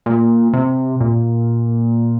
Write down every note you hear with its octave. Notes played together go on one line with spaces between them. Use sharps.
A#2
C3
A#2